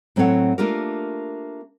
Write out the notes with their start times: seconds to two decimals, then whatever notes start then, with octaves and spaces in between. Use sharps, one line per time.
0.16 A2 F#3 C4 A4 C#5 F#5
0.58 A3 A#3 D4 F4 G4 A#4